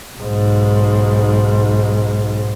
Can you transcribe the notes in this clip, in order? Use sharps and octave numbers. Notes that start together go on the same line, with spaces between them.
B1 G#2